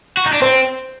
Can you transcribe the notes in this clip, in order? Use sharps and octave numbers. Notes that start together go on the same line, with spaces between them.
F#4
D#4
D4
C4 C5